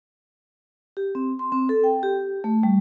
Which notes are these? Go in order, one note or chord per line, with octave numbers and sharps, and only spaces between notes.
G4
C4
C6
C4
A4
G5
G4
A3
G3